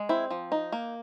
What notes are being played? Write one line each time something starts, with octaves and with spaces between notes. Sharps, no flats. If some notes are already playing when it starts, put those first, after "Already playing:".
Already playing: G#3
C4 E4
F3
D#4
A#3